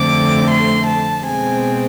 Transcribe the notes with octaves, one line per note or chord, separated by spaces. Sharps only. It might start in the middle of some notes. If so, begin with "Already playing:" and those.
Already playing: F2 D3 A3 C4 D6
C6
A5
B2 G#3 C4 G#5